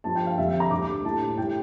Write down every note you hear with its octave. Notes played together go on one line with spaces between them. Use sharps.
G2 F3 A5
G5
F5
F2 D3 G3 E5
E5
A#5
D2 D3 G3 D6
D6
A2 G3 A5
A2 G3 G5